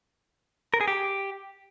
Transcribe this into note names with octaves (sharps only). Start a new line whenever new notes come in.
A#4
G#4
G4